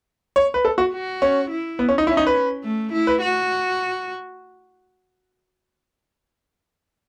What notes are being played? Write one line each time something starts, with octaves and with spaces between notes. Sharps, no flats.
C#5
B4
A4
F#4
F#4
C#4
E4
B3
C#4
D#4
C#4 E4
D#4
B4
A3
E4
B4
F#4